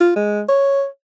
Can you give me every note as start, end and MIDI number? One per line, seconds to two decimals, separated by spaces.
0.01 0.11 65
0.16 0.42 56
0.49 0.86 73